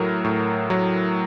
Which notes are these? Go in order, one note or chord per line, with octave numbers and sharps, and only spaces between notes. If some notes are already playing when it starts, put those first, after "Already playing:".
Already playing: A2 F#3 A#4
A2
F#3